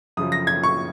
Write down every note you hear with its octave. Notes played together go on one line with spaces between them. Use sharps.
F#2 C#3 F3 D#6
A#6
G#6
C#6